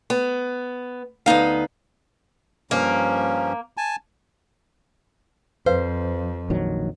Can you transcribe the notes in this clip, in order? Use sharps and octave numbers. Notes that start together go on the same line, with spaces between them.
B3
D2 B3 D#4 F5
G2 F3 A#3 C#4
G#5 A5
F2 B4 C5 F5
A#1 D#3 F#3